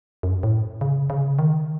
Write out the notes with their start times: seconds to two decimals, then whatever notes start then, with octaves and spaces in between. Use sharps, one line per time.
0.23 F#2
0.43 A2
0.81 C#3
1.10 C#3
1.39 D#3